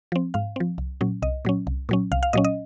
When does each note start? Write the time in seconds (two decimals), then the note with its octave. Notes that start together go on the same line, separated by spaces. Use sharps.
0.12 F3 C4
0.34 G#2 F5
0.56 F3 C4
0.78 C2
1.01 A#2 F#3 C#4
1.22 C2 D#5
1.45 A#2 F#3 C#4
1.67 C2
1.89 A#2 F#3 C#4
2.12 C2 F5
2.23 F5
2.33 A#2 F#3 C#4 D#5
2.44 D#5